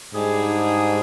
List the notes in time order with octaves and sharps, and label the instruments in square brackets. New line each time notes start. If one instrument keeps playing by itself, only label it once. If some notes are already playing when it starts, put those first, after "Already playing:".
[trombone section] G#2 [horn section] G3 D4 G#4